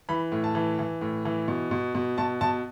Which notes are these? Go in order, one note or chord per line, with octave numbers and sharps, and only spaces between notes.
E3 B5
A2
A5
E3
E3
A2
E3
B2
B2
B2
B2 A5
B2 A5